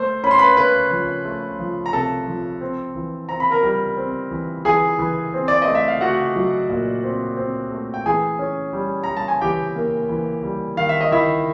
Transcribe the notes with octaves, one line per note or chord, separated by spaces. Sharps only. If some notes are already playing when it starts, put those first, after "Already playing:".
Already playing: A3 C5 C6
C#4 B5
C6
B4 B5
C#4 B4 B5
F3
A3
F3
A#5
C3 A4 A5
F3
C4
E3
C4 A#5
B5
A#4 A#5
G3
C4
E3
E3 G#4 G#5
E3
C4
D5
D#5
A3
E5
F5
A3 F#4 F#5
F#3
A#2
C4
C4
A3
G5
E3 G#4 G#5
C#4
G3
G3 A#5
A5
G#5
E3 G4 G5
A#3
E3
G3
D#3 F5
E5
D#5
D#3 E4 E5